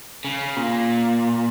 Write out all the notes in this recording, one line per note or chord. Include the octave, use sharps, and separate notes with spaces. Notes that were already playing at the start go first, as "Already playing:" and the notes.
C#3
A#2